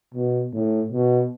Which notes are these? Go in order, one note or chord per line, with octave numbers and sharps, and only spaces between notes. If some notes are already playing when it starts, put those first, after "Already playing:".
B2
A2
B2